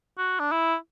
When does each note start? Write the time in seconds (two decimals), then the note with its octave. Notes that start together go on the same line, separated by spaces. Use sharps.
0.18 F#4
0.39 D4
0.52 E4